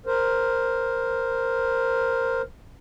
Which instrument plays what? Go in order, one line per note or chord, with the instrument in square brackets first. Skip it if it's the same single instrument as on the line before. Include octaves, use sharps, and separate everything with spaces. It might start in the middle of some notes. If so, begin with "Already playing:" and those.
[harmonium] A#4 C5